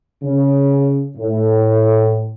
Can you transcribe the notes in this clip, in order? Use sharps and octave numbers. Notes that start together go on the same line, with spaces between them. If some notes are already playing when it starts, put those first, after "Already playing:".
C#3
A2